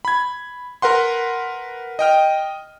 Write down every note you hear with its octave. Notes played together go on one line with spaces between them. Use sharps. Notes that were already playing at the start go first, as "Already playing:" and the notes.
B5 G#6
A#4 B4 F#5 C6
D#5 G5 F6